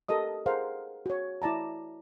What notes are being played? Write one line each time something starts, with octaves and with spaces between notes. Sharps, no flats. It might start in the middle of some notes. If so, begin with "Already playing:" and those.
G4 A4 A#4 D#5 D#6
G#4 A#4 C5 F5 F#5
F#4 C#5
E4 D5 A5 A#5